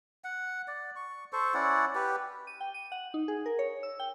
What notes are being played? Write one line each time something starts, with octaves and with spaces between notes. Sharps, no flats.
F#5
D5
C#6
A4 C5 C#6
C#4 E4 D5 F#5
G4 B4
D#7
G5
D#7
F#5
D#4
G#4
A#4
C#5
E6
G5